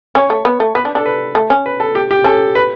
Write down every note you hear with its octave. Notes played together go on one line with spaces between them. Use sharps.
C#4 C#5
A3
B3
A3
B3 B4
D4
D4 A4
B4
A3
C#4
B4
A4
G4
G4
C#4 A4
B4